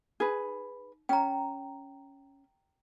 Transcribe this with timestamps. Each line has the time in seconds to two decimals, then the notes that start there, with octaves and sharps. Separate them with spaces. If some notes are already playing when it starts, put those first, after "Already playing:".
0.20 D#4 G#4 B4
1.09 C#4 G5 A#5